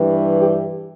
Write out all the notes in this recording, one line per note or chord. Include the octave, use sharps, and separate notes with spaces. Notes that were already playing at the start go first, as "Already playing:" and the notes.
Already playing: G2 E3 G3
G4